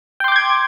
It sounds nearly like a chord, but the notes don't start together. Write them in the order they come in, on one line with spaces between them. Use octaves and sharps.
G5 C6 D6 G6 G#6